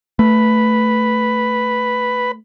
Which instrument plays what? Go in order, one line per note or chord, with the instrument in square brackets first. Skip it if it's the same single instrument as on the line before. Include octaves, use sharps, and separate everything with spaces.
[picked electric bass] A3 [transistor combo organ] B4 B5